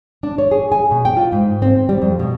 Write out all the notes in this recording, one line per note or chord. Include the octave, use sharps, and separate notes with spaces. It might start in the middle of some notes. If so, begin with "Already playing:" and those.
D4
C#5
G#4
G#5
B2
G5
F4
G#2
C4
G3
F2
B2